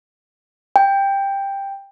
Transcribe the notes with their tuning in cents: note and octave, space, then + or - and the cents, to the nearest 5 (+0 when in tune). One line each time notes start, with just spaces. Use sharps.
G5 +10